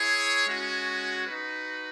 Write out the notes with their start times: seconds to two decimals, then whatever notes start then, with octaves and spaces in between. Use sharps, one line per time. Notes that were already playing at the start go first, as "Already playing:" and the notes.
Already playing: E4 G#4 C#5
0.47 G#3 C#4 F#4
1.27 D#4 F#4 B4